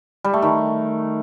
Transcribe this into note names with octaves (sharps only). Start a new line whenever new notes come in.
G3
A3
D#3